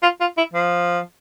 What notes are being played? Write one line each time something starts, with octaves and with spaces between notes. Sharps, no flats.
F4
F4
E4
F3